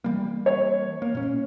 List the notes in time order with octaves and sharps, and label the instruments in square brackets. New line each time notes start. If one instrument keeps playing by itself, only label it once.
[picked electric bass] E3 G3 A#3
[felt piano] C#5
[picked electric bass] A#3
A#2 C#4